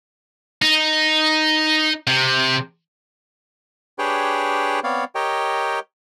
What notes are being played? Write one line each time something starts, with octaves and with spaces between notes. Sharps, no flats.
D#4
C3
D4 G4 G#4 B4 C#5 G5
B3 C4 C#5 D5 F5
G4 A#4 C#5 D#5 G5